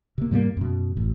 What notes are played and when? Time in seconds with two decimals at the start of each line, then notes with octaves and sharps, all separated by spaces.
0.18 C3 A#3
0.31 G#2 G3 A3 A#3
0.57 F#2 B2
0.97 A1